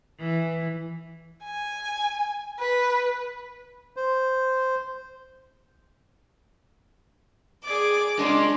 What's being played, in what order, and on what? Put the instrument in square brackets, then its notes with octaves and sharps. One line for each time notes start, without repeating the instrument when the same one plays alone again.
[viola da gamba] E3
[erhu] G#5
B4
[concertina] C5
[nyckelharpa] G#4 D5 [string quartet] D6
[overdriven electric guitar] G#3 C#4 [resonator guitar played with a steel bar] D4 [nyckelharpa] C6